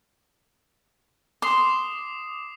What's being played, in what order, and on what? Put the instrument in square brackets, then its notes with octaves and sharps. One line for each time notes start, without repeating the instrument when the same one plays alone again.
[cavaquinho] C6 [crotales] D6 D#6 C7